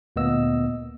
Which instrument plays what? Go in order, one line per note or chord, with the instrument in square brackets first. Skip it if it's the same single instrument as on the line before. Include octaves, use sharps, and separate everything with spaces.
[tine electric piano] D2 A#2 A#3 B3 D#5 E6